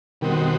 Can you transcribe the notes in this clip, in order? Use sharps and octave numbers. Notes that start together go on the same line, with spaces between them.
B2 D#3 G3 C4 D#4 F#4